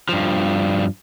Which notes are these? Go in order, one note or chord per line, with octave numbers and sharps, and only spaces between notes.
G2 F3